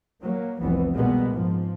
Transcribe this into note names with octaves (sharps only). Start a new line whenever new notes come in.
F#3 A#3
F1 C2 E3 B3
B2 G3 G#3 A#3 B3
G#2 F3